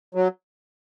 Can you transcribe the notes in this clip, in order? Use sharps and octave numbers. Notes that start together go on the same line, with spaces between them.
F#3